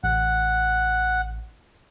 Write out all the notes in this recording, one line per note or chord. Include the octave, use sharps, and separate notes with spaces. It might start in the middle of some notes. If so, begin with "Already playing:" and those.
A1 F#5